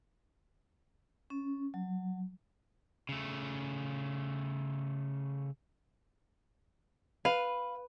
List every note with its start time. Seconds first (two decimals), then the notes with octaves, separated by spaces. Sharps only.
1.30 C#4
1.74 F#3
3.09 C#3 A3
7.25 B4 F5